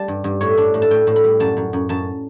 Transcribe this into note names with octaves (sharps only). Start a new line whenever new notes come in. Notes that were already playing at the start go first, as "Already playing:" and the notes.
Already playing: G3 A5
G2
G2
A2 C#5
D4
A2
A5
A2 G5
A2
B5
G3
F#2 A5
F#2
F#2
F#2 A5